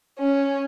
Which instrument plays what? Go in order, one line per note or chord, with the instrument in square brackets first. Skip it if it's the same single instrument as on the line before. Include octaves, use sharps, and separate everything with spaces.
[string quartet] C#4